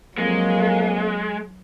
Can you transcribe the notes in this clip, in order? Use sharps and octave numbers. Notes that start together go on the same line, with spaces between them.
F2 F#3 G#3 A#3